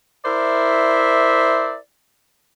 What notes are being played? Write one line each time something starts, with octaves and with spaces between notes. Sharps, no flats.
E4 A#4 C5 D5 E5